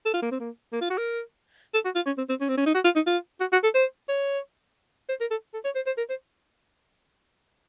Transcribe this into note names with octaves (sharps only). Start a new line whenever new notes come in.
A4
F4
A#3
C4
A#3
A#3
F4
F#4
A#4
A4
F#4
F4
C#4
C4
C4
C#4
C4
C#4
D#4
F#4
F4
D#4
F4
F#4
F#4
A4
C5
C#5
C5
A#4
A4
A4
C#5
C5
C5
A#4
C5